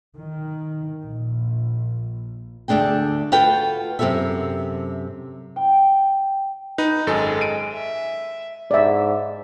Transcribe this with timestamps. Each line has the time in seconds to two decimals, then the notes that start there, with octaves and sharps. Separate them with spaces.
0.17 D#3
1.01 A#1
2.68 D2 A3 D4 G#4 G5
3.32 F4 F#4 A4 B4 F#5 G5
3.99 F#2 C3 E3 G4 A4 E5
5.56 G5
6.78 D#4 B4
7.07 G#1 F#2 G#3 A4
7.41 D7 D#7
7.73 E5
8.71 G#2 D5 E5